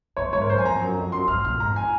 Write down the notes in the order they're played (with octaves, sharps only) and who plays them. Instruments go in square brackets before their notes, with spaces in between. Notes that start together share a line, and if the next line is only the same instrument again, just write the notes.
[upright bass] F#2 [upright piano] C#5
[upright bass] G#2 [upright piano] C#5
[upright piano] A#4
[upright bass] F#2 [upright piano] C5
[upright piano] G#5
[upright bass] F2 [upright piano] A#5
[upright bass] F#2
F2
[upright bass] F#2 [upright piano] C6
[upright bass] G#2 [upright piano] F6
[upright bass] A#2 [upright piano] F6
[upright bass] G#2 [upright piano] A#5
[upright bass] F2
[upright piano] G#5